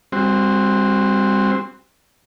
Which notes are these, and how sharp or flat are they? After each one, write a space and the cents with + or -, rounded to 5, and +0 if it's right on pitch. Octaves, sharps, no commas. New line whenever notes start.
G3 +35 C4 +0 F#4 +0